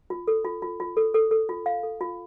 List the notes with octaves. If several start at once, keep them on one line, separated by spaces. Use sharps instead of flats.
F4
A4
F4
F4
F4
A4
A4
A4
F4
F5
A4
F4